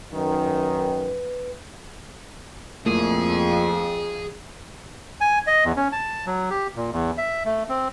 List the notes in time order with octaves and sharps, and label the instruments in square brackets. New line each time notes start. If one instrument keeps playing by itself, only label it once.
[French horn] F#2 [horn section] D#3 [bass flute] B4
[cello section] F2 [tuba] A#2 [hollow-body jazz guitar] A3 A#3 E4 [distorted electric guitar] G#4
[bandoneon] G#5
D#5
E2
C#4
A5
F#3
G4
A#2
E2
E5
A3
C4